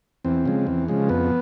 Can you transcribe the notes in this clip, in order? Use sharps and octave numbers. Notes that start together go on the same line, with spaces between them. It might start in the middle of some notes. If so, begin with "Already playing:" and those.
E2 C4
C#3 F3 G#3
E2
C#3 F3 G#3
F2 B3